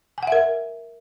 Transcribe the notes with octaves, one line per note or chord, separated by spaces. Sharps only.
A#4 E5 F#5 G#5